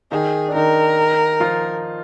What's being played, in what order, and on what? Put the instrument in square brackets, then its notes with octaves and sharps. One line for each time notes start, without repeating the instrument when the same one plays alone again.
[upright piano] D#3 D#4 [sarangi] G#4
[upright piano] D4
[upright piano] D#3 D#4 [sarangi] A#4
[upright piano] F3 F4